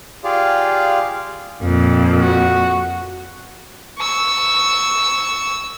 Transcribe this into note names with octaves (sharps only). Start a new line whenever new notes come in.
F4 G4 G#4 D5 F5
F2 A#2
F#4
C#6 E6